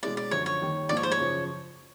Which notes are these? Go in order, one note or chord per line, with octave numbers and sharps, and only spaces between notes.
B2 G#3 C#4 E4 D5
D5
F#2 D3 F3 C#5
C#5
D#2 D#3 G3
G#2 F3 A#3 D#4 D5
C#5
C5
C#5
F#2 C#3 F3